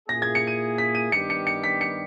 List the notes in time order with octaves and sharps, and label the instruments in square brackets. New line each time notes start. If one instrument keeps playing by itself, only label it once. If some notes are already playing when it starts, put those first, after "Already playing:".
[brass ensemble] A#2 A#3 E4 G#4 [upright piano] A#6
[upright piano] G#6
C#7
D#7
B6
D#7
[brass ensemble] G2 D#3 G3 B3 G4 [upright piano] C#7
[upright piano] C#7
C#7
B6
C#7